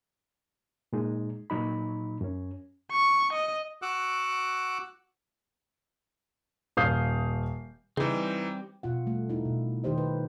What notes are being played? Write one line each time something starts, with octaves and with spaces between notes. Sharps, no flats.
A#2 G#3 D#4
A#2 F#3 D#4 B5
F#2 C#4
C#6
D#5
F#4 F#5 D6 E6 F#6
D#1 F5 D#6 G6 C7
C#3 E3 G3 C4 D#4
B2 F4 F#5
G3 A3
D#4 E4
B2
D#3 D#4 G4 C5 D#5
B4